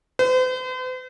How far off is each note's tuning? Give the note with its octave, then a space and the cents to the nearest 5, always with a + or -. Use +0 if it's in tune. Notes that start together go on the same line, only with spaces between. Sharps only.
C5 -45